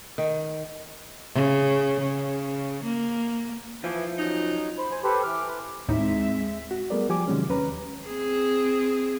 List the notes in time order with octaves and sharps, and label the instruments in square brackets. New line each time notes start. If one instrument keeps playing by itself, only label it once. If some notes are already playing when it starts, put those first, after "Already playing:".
[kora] D#3
[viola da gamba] C#3
C#3
A#3
[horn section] E3 [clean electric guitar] F3
[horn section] F#3 C#4 D#4
[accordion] C5 B5
C5 G#5
G4 A4 B4 C5
E3 D6 F6
B4
[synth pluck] D#2 A2 D#4 [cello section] G#3 C4 E5
[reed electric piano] F#4
G3 A3 B3 G#4 A#4 D5
F3 G4 G#5 D6
C3 D#3 F#3 G#3 C#4
D#2 C#4 B4 A#5
[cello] C4 G#4